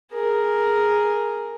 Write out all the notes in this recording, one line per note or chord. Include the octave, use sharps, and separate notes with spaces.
G#4 A#4